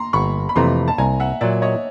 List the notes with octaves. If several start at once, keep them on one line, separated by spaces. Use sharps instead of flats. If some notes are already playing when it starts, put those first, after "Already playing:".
Already playing: A#5 C6
G1 B5 C#6
B5
F2 C3 E3 A3 A#5 C6
A5
C2 G#5 A#5
E5 F#5
A#2 F#3 D5 E5
C#5 D#5